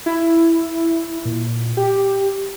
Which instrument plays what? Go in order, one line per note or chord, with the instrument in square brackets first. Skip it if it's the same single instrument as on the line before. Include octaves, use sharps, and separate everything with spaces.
[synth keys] E4
A#2
G4